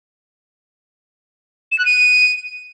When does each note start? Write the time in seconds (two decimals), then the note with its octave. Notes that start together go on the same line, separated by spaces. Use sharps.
1.72 E7
1.79 F#6
1.85 D#7